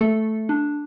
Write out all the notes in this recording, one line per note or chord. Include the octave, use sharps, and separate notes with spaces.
A3 A4
D4